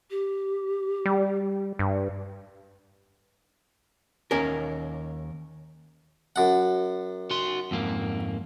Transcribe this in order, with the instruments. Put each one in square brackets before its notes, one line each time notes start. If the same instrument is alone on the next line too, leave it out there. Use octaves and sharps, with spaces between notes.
[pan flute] G4
[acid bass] G3
G2
[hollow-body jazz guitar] D#2 C#4 A#4
[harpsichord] F#2 F#5
[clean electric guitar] F#4 C6
F2 G#2 A#3